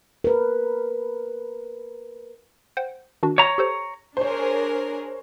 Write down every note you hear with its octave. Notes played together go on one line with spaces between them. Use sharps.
A#4 B4
C5 F#5 G5
D#3 D4 F#4
C#5 A#5
G4 A4 C5
D4 G#4 A#4 C5 C#5